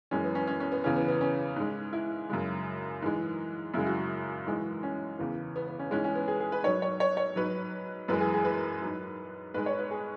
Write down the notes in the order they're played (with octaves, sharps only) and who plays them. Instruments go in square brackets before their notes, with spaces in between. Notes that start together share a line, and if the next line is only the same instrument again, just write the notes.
[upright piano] F#2 E3 G#3 C#4
B3
C#4
C#4
C#4
B3
E2 C#3 E3 C#4
B3
B3
C#4
G#2 G#3
E4
F#2 C#3 G#3
G#2 E3 G#3
F#2 C#3 G#3 E4
F#4
F#4
G#2 E3 G#3
C#4
E2 C#3 E3
B3
B3
C#4
G#2 E3 G#3 C#4
C#4
B3
G#4
G#4
B4
G#2 F#3 C#5
C#5
C#5
C#5
G#2 F#3 B4
F#2 E3 G#3 B4
G#4
G#4
B4
G#2 F#3
G#2 G#3 B4
C#5
B4
G#4